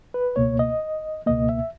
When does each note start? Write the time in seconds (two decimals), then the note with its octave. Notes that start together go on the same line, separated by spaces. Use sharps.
0.14 B4
0.36 C#2 B2 A#3 C#5
0.59 D#5
1.26 C#2 B2 A#3 D#5
1.49 E5